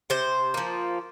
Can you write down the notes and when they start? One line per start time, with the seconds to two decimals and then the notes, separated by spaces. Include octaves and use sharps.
0.10 C3 C5
0.54 F3 A#3